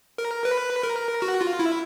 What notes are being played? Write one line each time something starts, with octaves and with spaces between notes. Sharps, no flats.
A#4
B4
A#4
F#4
F4
E4